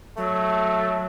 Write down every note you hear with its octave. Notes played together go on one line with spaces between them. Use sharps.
F#3 A3